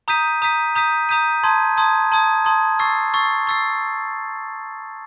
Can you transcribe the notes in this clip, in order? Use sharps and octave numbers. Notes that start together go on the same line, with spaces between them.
A#5 D#6 G6 B6 D#7
A#5 D#6 G6 B6 D#7
A#5 D#6 G6 B6 D#7
A#5 D#6 G6 B6 D#7
A5 C6 D#6 G#6
A5 C6 D#6 G#6
A5 C6 D#6 G#6
A5 C6 D#6 G#6
C#6 E6 A6 C7
C#6 E6 A6 C7
C#6 E6 A6 C7